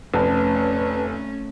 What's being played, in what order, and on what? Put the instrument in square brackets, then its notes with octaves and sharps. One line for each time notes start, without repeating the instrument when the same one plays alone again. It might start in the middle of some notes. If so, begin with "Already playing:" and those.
[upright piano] F1 [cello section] A3 C#4 [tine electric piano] B4 A5